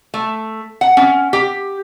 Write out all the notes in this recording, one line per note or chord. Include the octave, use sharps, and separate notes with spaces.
A3
F#5
C#4
G4